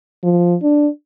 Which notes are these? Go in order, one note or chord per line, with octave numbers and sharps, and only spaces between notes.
F3
D4